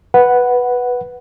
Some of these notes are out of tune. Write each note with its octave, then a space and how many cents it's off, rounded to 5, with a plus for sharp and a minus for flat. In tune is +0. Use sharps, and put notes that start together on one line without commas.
B4 -5 F#5 +0